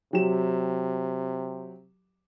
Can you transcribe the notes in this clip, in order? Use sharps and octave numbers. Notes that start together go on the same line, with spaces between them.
C3 F#3 G4 E7